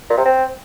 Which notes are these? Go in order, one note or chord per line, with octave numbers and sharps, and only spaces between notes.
A#2
C3
C4